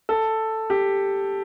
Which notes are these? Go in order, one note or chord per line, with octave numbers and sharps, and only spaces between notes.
A4
G4